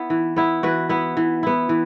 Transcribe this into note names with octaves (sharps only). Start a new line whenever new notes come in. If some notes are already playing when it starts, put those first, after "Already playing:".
Already playing: B3 E4
E3
B3 E4
E3 F#4 B4
B3 E4
E3
B3 E4
E3